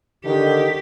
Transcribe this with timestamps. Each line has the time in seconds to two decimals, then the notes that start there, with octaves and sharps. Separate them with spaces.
0.25 D3 D#3 G4